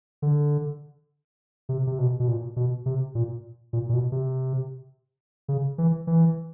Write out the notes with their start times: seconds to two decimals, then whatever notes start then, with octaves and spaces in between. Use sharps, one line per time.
0.22 D3
1.69 C3
1.87 C3
1.99 B2
2.20 B2
2.28 A#2
2.56 B2
2.86 C3
3.15 A#2
3.73 A#2
3.89 A#2
3.93 B2
4.12 C3
5.48 C#3
5.78 E3
6.07 E3